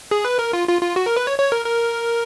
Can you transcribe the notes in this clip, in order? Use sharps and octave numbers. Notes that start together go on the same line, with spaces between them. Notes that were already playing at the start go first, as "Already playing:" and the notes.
G#4
B4
A#4
F4
F4
F4
F#4
A#4
B4
C#5
C#5
A#4
A#4